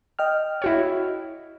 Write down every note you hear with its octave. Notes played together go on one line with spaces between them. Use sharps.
D#5 G5 F6
E4 F#4 C#5